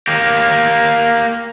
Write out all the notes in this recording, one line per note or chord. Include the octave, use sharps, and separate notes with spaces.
A#3 G4